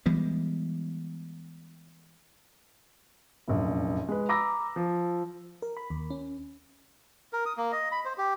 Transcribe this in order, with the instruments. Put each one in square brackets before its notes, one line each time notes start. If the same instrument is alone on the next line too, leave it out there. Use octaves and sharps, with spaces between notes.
[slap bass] E3 G3 G#3 B3
[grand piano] F1 A#1 F#2
G#3 B4
A#5 B5 D6 E6 A#6
F3
[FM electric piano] A#4
B5
D#2
C#4
[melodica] A#4
D#6
A#3
D#5
B5
C5
G4